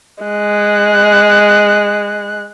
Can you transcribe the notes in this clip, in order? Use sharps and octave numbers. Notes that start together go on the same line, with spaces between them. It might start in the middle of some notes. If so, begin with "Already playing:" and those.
G#3 F#6